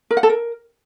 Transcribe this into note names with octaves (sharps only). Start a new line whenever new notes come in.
A#4
F#5
A4
A#4